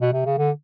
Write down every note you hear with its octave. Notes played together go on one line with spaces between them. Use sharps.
B2
C3
C#3
D3